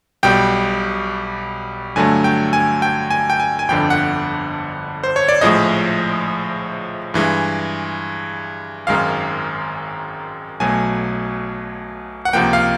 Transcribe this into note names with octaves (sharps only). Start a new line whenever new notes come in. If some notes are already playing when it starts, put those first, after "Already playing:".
B1 B2 G3 G5
G2 D3 F#3 A3 G#5
G5
G#5
G5
G#5
G5
G#5
G#5
G1 F2 D3 G5
F#5
C5
C#5
D5
A#1 A2 F3 G#3 D#5
G2 E3 G#3
G#1 F#2 D#3 G#3 F5
B1 B2 F#3 A3 G#5
F#5
C#2 C3 F3 A#3 G5
F5